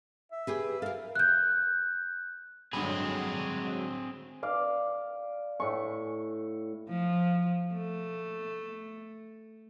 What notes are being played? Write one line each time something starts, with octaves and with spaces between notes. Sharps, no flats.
E5
G4 G#4 B4
A4 A#4 F5
F#6 G6
G2 D3 F#3 G#3 C4 G#4 B5
D5 F5
A2 C#6
F3
A3